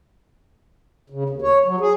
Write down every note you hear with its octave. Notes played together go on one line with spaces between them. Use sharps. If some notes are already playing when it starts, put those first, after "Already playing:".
C#3
D#2
C#5
F#3
G#4